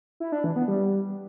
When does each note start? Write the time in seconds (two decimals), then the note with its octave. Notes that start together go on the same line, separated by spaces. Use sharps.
0.20 E4
0.32 D4
0.44 E3
0.56 B3
0.68 G3